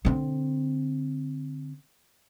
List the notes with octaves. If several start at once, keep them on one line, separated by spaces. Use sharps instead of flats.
D3 C4